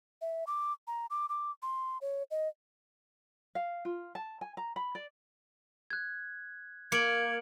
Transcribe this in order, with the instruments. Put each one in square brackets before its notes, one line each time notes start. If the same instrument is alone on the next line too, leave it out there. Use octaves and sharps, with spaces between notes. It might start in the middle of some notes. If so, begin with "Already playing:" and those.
[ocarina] E5
D6
A#5
D6
D6
C6
C#5
D#5
[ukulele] F5
F4
A5
G#5
A#5
B5
D5
[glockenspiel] F#6 G#6
[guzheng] A#3 [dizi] G#6 [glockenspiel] C#7 D7 F#7